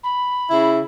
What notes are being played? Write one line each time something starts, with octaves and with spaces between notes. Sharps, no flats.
B5
C#3 E4